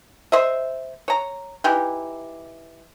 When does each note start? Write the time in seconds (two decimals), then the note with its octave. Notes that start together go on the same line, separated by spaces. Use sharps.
0.32 C5 D#5 E5
1.08 C#5 A#5
1.64 E3 D#4 G4